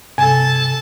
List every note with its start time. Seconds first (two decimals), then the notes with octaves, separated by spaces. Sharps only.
0.18 G2 C3 A4 G#5 A5